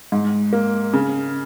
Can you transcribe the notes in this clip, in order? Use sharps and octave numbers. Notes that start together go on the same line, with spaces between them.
G#2
A#3
C#3